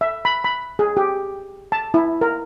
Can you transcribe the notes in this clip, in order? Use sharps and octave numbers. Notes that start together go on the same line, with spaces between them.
E5
B5
B5
G#4
G4
A5
E4
A#4